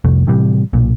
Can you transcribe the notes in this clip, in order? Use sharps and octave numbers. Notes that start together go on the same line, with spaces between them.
C2 F2 C3 A3
A2 C3 E3 G3
B1 A#2